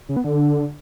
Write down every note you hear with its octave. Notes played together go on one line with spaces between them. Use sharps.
C#3
B3
D3